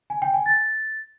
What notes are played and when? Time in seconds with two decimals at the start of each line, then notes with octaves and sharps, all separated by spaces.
0.10 G#5
0.22 G5
0.34 G#5
0.46 A6